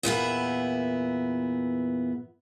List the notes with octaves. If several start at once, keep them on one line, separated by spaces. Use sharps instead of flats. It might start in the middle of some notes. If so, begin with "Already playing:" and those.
E2 A#2 B3 E4